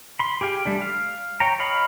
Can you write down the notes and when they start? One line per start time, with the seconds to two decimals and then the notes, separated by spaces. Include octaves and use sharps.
0.19 B5 C6
0.41 G4 G#4 F5 G5
0.65 G3 A3 D4
0.81 F5
1.40 C#5 G5 A#5
1.59 C#5 D#5 F5 B5